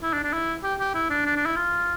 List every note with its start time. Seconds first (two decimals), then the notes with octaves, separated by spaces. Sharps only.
0.03 E4
0.13 D4
0.24 D4
0.33 E4
0.64 G4
0.80 G4
0.95 E4
1.10 D4
1.26 D4
1.36 D4
1.46 E4
1.56 F4